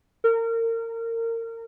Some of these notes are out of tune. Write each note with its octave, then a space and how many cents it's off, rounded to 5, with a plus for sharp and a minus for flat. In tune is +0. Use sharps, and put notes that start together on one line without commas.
A#4 -30